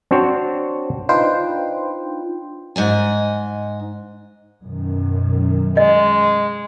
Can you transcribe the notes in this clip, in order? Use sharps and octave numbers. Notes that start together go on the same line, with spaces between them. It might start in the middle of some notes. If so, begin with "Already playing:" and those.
C4 D4 F#4 C5 C#5
D4 D#4 F4 B4 C5 G5
G#2 D#5 G#5
F#2 B2 D#3
G#3 D#5